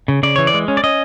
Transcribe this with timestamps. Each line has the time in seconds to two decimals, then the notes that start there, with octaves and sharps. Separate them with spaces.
0.08 C#3
0.23 C#3 D5
0.36 E3 C#5
0.47 D5
0.54 G#3
0.68 C#4
0.77 D5
0.84 C#4 D#5